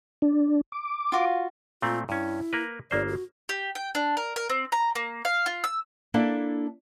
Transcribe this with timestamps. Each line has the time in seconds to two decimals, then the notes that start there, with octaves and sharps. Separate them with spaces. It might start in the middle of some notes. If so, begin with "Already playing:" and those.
0.22 D4
0.72 D6
1.12 F4 F#4 F5
1.82 A#2 A3 C4 F4
2.09 G2 C#4 E4
2.53 A#3 A#4 B4
2.91 G1 A#3 C5 D5
3.08 F#4
3.49 G4
3.75 G5
3.95 D4
4.17 A#4
4.36 A#4
4.49 C4
4.72 A#5
4.95 A#3
5.25 F5
5.46 F4
5.64 E6
6.14 A#3 D4 E4 A4 D5 E5